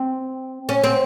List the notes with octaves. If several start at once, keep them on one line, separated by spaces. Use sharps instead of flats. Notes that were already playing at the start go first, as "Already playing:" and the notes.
Already playing: C4
C#4
C4